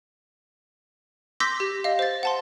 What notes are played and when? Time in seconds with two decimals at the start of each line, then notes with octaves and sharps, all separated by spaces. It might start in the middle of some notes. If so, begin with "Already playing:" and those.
1.40 C6 D6 E6 G6 A#6 B6
1.60 G4
1.84 D#5 F5
1.99 C5 A6
2.23 F#5 A5 C6